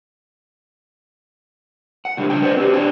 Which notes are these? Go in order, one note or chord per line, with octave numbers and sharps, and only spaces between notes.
F#5
A2 C3 D#3 G3 D4
C#3 D4 G5
B4 C5 D5 D#5 F#5
C4 F#4 G4
C3 D4 C#5 D5 G5